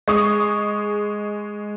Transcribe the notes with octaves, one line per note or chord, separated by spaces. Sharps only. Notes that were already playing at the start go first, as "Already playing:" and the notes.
G#3 C#6 D#6